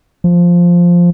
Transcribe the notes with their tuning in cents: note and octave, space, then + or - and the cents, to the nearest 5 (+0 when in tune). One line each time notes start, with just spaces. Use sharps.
F3 +0